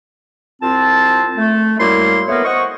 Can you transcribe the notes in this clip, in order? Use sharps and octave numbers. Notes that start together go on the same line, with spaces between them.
C2 C4 F4 A5
A3
F#2 G3 A#3 E4 C6
A3 B3 A#4 B4 C#5
C5 D#5 F#5 C#6